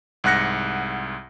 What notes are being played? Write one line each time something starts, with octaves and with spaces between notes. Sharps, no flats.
C2 G#2 F#5 F#6 A#6 C#7